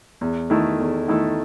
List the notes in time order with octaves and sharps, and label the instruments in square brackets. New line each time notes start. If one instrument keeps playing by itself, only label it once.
[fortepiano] E2
D#3 A3 E4 A4
E2
D#3 A3 E4 A4